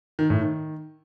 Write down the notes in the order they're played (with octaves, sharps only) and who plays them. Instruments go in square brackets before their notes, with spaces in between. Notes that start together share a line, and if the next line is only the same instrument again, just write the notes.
[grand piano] D#3
A2
D#3